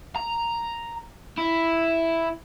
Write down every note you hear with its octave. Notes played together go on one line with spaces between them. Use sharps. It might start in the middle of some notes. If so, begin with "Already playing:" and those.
A#5
E4